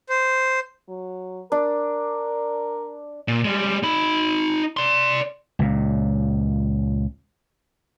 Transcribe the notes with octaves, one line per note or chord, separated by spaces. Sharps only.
C5
F#3
D4 A#4
A#2
G3 G#3
D#4 B5
D5 C6
C#2 A#2